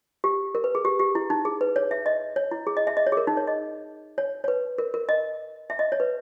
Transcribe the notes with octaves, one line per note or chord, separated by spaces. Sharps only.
G4
A#4
B4
G#4
G4
G4
E4
D#4
G#4
B4
C#5
E5
D#5
C#5
E4
G#4
D#5
E5
D#5
C#5
G#4
A#4
D#4
C#5
D#5
C#5
C#5
B4
A#4
A#4
D#5
E5
D#5
C#5
B4